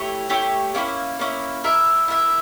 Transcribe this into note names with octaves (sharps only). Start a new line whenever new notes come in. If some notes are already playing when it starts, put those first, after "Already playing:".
Already playing: A3 E4 G4 C#5
A3 E4 G4 C#5
A#3 C#4 E4
A#3 C#4 E4
E4 A#4 E5
E4 A#4 E5